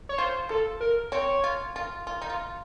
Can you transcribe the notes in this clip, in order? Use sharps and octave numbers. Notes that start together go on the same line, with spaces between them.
C#5
F4 C5
F4 A4
A#4
C4 C#5
F4
F4
F4
D#4
F4